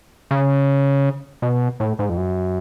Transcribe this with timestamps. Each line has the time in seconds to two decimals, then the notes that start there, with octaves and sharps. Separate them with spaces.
0.31 C#3
1.42 B2
1.80 A2
1.99 G#2
2.09 F2
2.17 F#2